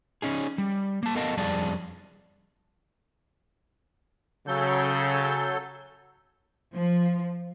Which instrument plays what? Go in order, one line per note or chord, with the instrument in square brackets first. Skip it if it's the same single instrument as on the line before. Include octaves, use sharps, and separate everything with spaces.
[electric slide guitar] C#4 D#4 G#4
G3
A#3 A5
B3 A4 A#4 D#5 F5 A5
F2 G3 G#4 D5 A5
[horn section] C#3 [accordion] F#3 A4 G6
[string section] F3